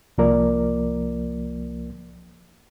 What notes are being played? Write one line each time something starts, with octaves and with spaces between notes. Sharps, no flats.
C2 F3 A#3 A#4 D5